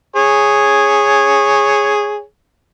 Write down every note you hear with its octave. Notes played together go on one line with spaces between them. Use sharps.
G#4 C#5